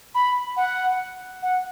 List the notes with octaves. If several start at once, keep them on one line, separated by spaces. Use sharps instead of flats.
B5
F#5
F#5